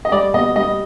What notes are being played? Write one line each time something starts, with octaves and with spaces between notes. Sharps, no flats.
D#5
G3 D5
B2 D#5
G3 D#5